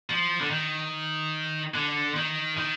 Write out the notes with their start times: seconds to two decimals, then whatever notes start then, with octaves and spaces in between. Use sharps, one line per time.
0.10 F3
0.41 D3
0.51 D#3
1.74 D3
2.16 D#3
2.57 D#3